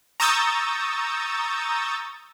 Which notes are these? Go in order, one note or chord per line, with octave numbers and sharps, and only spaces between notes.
A#5 C#6 D#6 E6 G6 A6